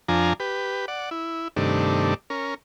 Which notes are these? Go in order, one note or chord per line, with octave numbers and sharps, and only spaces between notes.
F2 F3 D4 G#5 A#5
G4 B4
D5 F#5
E4
G2 C3 D#3 A3 D4
C#4 A#4